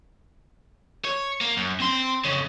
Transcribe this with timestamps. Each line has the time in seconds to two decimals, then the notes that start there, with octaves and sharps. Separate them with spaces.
1.05 C#5
1.41 A#3
1.57 F#2
1.80 C4 C6
2.25 F2 C#3